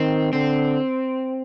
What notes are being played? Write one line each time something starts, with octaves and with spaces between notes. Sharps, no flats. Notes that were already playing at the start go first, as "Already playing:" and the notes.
Already playing: D#3 C4
D3 C4